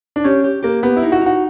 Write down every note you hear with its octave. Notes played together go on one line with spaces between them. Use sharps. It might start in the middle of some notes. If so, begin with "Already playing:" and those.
D4
C#4 G4
G4
A#3 G4
B3 G4
E4
D#4
F#4
D#4
F#4